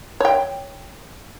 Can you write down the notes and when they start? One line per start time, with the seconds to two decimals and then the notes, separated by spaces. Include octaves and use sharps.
0.20 C#5 G5